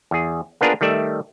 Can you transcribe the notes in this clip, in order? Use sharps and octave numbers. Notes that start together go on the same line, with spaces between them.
E2 G#4
A#3 B3 D4 F4 G#4 A#4
D#3 G3 A3 D5 E5